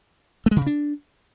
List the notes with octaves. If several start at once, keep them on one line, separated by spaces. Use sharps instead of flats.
A3
G#3
D3
C#3
D4